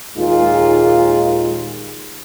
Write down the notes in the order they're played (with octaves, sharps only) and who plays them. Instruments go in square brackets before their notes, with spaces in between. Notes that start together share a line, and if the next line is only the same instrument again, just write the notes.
[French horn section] D#2 A#2 G#3 D#4 F4